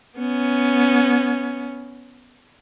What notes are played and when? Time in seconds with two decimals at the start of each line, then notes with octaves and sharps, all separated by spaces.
0.17 B3 C#4